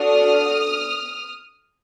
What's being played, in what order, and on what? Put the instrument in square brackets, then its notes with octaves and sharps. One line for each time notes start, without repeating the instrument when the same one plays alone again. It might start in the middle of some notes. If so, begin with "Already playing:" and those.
Already playing: [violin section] D4 F#4 A4 D#6 F6